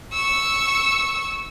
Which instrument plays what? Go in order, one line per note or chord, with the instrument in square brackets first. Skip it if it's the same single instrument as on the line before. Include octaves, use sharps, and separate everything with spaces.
[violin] C#6 E6